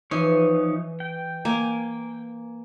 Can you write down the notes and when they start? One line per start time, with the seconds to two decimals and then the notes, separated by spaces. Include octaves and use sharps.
0.11 E3 F3 D#4 C#5
1.00 G5
1.45 A#3 G#5